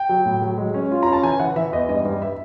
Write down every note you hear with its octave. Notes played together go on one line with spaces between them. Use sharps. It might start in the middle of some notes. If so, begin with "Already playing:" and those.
Already playing: G5
F#3
A2
F#3
G#3
C#4
F4
C#4 A#5
A5
E3 G#5
E3 F#5
E3 E5
E2 D#5
G2 D#5
G2
E5